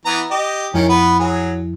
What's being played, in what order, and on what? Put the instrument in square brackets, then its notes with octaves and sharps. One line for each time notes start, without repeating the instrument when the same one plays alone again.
[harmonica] E3 B3 A#5
G4 D#5
[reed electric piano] F2 F3 E4 [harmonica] D#3 C#4
[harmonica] B3 B4
F#3 G#4